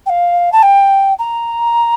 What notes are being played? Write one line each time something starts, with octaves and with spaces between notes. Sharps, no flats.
G5
F5
A5
G5
A#5